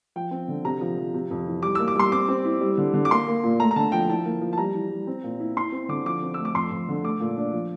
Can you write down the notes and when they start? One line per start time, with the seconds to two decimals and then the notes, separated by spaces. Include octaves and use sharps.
0.16 F3 G5
0.31 C4
0.48 D3
0.64 C3 A#5
0.81 F3
0.98 F3
1.14 C3
1.31 F2
1.47 E3
1.63 G3 D6
1.75 A#3 E6
1.88 D6
1.96 G3 C6
2.12 C4 D6
2.29 C4
2.45 E4
2.61 G3
2.78 D3
2.94 D3
3.05 D6
3.11 A#3 C6
3.28 A#3
3.44 A#2
3.60 A3 A#5
3.71 A#5
3.76 D3 A5
3.92 F3 G5
4.09 E4 A5
4.25 A#3
4.41 F3
4.53 A5
4.58 G3 A#5
4.74 E3
4.91 G3
5.07 C4
5.23 A#2
5.40 E4
5.57 E4 C6
5.72 C4
5.89 D3 D6
6.05 F3 D6
6.23 C4
6.34 A3 E6
6.45 D6
6.54 F2 C6
6.71 F2
6.88 D3
7.04 A3 D6
7.20 A#2
7.37 D4
7.53 F3